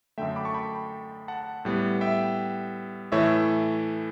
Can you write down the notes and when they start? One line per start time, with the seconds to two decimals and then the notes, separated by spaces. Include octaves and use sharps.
0.18 F#2 D3 A3 E5 G5
0.36 B5 D6
0.45 A5 C#6
0.54 G5 B5
1.28 F#5 A5
1.65 A2 G3 B3
2.01 E5 G5
3.12 A2 E3 A3 C#5 E5